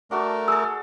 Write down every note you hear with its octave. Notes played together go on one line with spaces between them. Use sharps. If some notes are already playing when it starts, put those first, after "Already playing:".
A3 D4 F#4 A4 A#4
G#4 A4 E6